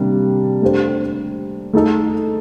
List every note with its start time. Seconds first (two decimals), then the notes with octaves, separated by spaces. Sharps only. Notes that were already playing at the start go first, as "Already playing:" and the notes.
Already playing: C3 D#3 G3 A#3 D4
0.61 A3 D4 G4 C5
1.73 A3 D#4 A4